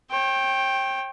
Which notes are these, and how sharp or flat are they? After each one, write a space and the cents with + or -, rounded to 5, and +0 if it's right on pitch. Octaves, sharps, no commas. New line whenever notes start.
C#5 -40 G5 +0